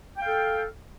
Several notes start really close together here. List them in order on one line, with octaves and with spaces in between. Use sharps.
G5 F5 A4